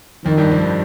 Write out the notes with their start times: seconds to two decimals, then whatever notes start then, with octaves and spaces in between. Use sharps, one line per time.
0.24 F2 D#3 F3
0.38 G2 G3
0.51 F2 F3
0.64 D#3